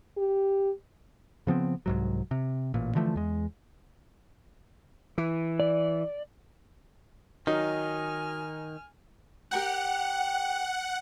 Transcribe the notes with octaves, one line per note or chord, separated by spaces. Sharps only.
G4
C#3 F3 B3 C4
C2 G#2 F#3
C3
A1 A#2
D3 E3 F3 A3
E2 G#3
E3
D5
D#3 F#3 D#4 G#5 F6
G4 A#4 F#5 G5